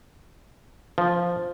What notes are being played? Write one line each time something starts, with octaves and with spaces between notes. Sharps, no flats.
F3